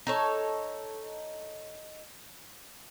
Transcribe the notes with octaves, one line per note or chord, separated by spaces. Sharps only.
D#4 A4 C#5